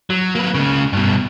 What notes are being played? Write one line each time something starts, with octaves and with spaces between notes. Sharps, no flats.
F#3
A#3 B4
C#2 C#3
G2 B2